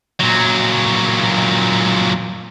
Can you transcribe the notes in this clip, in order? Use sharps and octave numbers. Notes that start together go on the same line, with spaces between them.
A#2 F#3